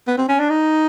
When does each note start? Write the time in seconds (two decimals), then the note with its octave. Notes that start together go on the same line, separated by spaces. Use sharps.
0.07 B3
0.18 C4
0.29 C#4
0.40 D4
0.49 D#4